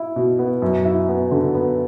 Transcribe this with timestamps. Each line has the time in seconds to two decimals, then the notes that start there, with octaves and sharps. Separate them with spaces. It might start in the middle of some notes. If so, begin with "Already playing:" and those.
Already playing: E4
0.16 B2
0.39 B3
0.62 F#2
0.85 E4
1.09 B3
1.31 D3
1.55 B3